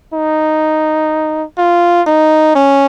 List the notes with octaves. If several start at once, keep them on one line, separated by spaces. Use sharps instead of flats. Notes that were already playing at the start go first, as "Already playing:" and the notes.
D#4
F4
D#4
C#4